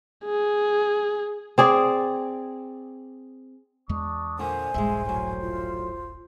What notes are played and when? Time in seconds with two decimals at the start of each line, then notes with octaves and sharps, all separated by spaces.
0.24 G#4
1.58 C4 G#4 D5
3.89 E2 G#3 D4 C#6 D#6
4.39 A#2 D3 C5 G#5
4.74 D#1 A#1 G2 G#3 E5
5.05 A2 F#3
5.41 F4